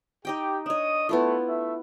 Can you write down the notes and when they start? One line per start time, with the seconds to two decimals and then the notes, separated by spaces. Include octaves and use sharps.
0.25 D#4 G4 D#5 G5
0.66 D4 C#5 D#5 D#6
1.09 A3 B3 E4 F4
1.47 A3 E5